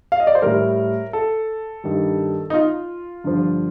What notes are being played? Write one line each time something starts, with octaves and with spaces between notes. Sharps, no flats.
F5
D#5
D5
C5
A2 G3 A#4
A4
G2 D#3 G3
D#4
F4
G2 D3 F3